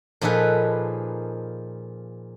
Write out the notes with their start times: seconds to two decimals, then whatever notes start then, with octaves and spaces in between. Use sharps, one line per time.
0.21 A#2 F3 D#4 G#4 A4 B4